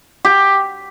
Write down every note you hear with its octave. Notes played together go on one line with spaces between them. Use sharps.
G4